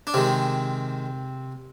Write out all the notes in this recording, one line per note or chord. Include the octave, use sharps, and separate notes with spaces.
D4
C3 D#3 G#3 C4